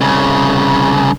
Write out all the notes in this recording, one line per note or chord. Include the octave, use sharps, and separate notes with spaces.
C2 C#3